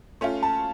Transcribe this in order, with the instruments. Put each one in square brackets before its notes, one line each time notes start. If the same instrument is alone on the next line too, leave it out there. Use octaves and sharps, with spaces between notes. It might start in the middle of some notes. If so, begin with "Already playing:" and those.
[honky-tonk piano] A3 C#4 F4
[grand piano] A5